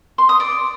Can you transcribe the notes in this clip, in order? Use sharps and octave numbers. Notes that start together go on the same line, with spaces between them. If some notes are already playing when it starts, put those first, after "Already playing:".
C6
D#6
D5